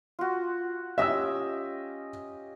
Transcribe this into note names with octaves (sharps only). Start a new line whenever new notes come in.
F4 F#4
C#4 G4 D#5 E5 E6